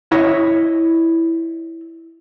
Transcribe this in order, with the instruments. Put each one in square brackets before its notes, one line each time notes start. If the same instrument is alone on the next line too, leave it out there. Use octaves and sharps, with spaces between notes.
[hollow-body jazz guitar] E4 C#5 D#5